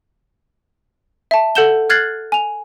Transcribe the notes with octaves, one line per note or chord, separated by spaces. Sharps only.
E5 A5
A4 F#5 G6 E7 G7
F6 F#6 G#6 A6 C7 F#7
G#5 F7